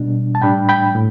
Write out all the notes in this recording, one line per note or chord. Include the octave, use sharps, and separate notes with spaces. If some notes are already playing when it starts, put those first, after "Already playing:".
Already playing: B2 G3 D4
A5
A2 G3 D4 G5 B5
G5 B5
A2